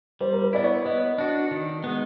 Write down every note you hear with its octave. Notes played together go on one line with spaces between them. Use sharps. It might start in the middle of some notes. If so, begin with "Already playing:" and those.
G3 C5
A#4
B4
B3 E4 D5
C#5
B3 D#5
D4 F#4
D#3
G#3 B3